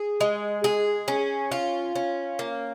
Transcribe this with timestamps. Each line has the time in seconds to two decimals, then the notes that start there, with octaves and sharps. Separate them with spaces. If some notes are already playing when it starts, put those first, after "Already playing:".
Already playing: G#4
0.20 G#3
0.64 G#4
1.08 C#4
1.51 F4
1.95 C#4
2.39 A#3